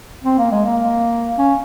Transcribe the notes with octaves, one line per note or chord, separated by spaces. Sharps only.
C4
A#3
G#3
A#3
C#4